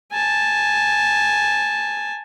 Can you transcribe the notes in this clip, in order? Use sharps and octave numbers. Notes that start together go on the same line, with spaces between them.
G#5 A5